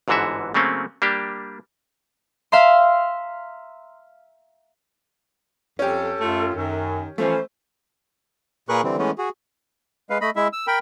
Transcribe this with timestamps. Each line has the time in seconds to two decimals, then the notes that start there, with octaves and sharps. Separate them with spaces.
0.08 G1 G#2 D3 E3 F#4 E5
0.54 C#3 F#3 A3 A#3 C4 C#4
1.02 G3 A#3 D4 G4
2.52 E5 F5 A#5 C6
5.79 F2 C#4 G4 A4
6.20 F#2 A3 F4
6.54 F#2 D#3
7.18 E3 F3 A3 C#4 C5
8.69 A#2 G#4 A#4 B4 C#6 F#6
8.83 D3 E3 G3 C4
8.98 E3 G#3 A3 B3 C#4
9.18 F#4 G#4
10.10 G#3 B4 F5
10.21 A3 D#5 B5
10.36 G#3 E4 E5
10.53 E6
10.67 A#4 G5 B5